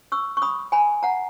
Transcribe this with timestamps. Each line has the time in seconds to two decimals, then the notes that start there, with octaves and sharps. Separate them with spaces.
0.12 C#6 E6
0.37 C#6
0.42 B5 D#6
0.72 G#5 B5
1.03 F#5 A#5